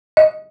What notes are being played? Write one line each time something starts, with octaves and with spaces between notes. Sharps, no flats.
D#5